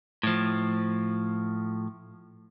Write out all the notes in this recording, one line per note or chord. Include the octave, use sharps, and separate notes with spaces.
A2 F3